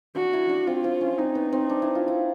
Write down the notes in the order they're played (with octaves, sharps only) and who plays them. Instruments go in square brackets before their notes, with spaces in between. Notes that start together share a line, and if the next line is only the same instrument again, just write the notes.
[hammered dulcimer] D4 [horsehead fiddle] F#4
[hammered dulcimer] E4
D4
[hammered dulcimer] C4 [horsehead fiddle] F4
[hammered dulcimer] C4
C#4
[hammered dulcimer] C4 [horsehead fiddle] D#4
[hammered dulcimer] B3
C4
D4
E4
F4
E4